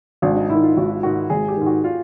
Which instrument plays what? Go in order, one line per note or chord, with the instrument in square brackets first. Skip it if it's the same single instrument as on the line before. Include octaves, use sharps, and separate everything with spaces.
[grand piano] G#1 [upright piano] D4
[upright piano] D#4
[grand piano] G#2 D#3 [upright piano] E4
[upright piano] F4
[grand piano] G#1 [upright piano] F#4
[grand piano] G#2 D#3 [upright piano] F#4
[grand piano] G#1 [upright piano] G#4
[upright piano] G4
[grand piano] G#2 D#3
[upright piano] F#4
F4